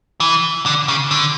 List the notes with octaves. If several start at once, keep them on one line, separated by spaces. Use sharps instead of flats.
E3
D3
C#3
D3